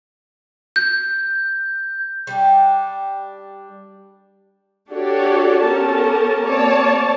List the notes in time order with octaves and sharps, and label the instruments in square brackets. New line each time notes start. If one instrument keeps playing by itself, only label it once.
[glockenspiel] G6
[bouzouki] G3 D4
[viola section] D4 F#4 G4 A4 C#5 D5
B3 C#4 G4 A4 A#4 A5
A#3 C4 C#5 D5 A5